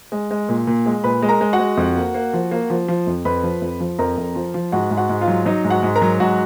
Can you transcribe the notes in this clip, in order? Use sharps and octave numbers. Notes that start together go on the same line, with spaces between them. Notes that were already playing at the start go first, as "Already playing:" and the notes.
G#3
G#3
A#2
A#2
G#3
A#2 B4 B5
G#3
A#4 A#5
G#3
F#4 F#5
G#3
F2
A#3
A#3
F3
A#3
F3
F3
F2
F2 B4 B5
F3
F2
F3
F2 A#4 A#5
F2
F3
F3
G#2 F#4 F#5
G#2
F#4 F#5
G#2
F4 F5
F#3
F#3 D#4 D#5
G#2
F#4 F#5
G#2
A#4 A#5
F#3
G#2 F#4 F#5